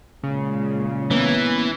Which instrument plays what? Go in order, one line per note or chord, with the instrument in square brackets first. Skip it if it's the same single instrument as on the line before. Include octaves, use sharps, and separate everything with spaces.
[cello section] A#2 G#3 [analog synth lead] C#3
[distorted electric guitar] E3 [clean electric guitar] A#3 B3 C#4